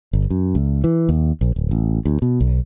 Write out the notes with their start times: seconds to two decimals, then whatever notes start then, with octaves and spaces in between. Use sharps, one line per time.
0.13 G1
0.30 F#2
0.55 C#2
0.84 E3
1.09 D#2
1.41 A#1
1.56 D1
1.71 A1
2.05 D2
2.22 B2
2.41 B1